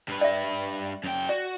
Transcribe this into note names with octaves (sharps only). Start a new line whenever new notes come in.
G2 B4
D5 E5
F#2 G5
F#4 D5